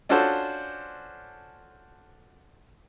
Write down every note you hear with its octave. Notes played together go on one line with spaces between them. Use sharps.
C#4 D4 F4 F#4 A4 C5